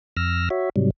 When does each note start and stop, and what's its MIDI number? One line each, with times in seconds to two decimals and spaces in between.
0.17 0.49 41
0.17 0.49 88
0.17 0.49 89
0.17 0.49 94
0.50 0.69 66
0.50 0.69 73
0.50 0.69 76
0.76 0.90 44
0.76 0.90 48
0.76 0.90 54
0.76 0.90 55